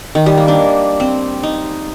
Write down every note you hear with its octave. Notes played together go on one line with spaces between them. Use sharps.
D#3
G3
A#3
D4
C4
D#4